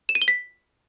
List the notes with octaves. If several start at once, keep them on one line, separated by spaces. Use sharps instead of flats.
E7
D#7
G7
B6